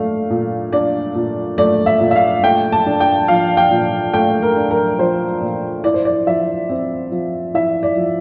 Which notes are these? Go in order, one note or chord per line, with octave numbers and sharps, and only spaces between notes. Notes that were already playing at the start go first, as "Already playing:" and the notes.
Already playing: A#2 A3 D4 F5
A#2
D4 D5
A#2
A3 D5
E5
A#2
E5
F5
A3 G5
A5
D4
G5
F3 F5
G5
A#2
A3 G5
A#4
D4
A#4
F3 C5
A#2
E4 D5
C5
D5
F3 E5
C4
F3
E4 E5
D5
F3